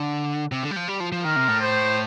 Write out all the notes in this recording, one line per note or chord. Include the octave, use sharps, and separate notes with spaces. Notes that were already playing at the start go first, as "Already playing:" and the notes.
Already playing: D3
C3
D3
G3
F3
G3
F3
F3
D#3 A#4
C3
A2
C5